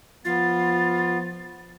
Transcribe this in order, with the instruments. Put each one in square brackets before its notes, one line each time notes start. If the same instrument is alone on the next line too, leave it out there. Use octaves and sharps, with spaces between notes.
[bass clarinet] F3 [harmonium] B3 [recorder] F4 [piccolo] A6